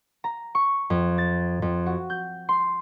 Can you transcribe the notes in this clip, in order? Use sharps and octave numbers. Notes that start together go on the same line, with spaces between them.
A#5
C#6
F2
A6
F2
F#4
G6
C6